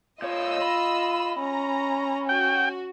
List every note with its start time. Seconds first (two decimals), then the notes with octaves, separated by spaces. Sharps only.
0.22 A#2 F4 C#5 D#5 E6
0.62 B5
1.40 C#4 A#5
2.29 F#4 G5